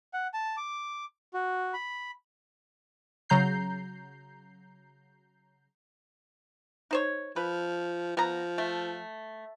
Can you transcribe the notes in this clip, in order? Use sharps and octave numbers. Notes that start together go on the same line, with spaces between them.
F#5
A5
D6
F#4
B5
C#3 F#3 A#5 G6 C7
D#4 C5 C#5
F3 B4
F3 B3 A#5
A3